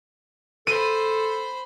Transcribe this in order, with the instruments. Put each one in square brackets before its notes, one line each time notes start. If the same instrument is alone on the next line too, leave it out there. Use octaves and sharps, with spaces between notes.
[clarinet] A4 [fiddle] C5 B5 [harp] D#7